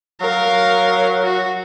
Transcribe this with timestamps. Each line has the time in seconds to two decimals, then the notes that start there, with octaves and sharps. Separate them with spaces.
0.21 F#3 A#4 F5
1.23 F#4